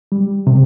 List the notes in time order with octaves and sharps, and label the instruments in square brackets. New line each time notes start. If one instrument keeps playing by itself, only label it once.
[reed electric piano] G3
C3